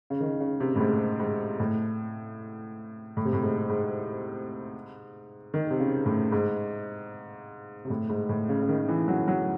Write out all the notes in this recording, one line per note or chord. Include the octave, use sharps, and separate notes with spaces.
C#3
D#3
C#3
C3
A2
G#2
G#2
A2
A2
C3
A2
G#2
G#2
D#3
C3
C#3
A2
G#2
C3
A2
G#2
A2
C#3
C#3
D#3
E3
F#3
F#3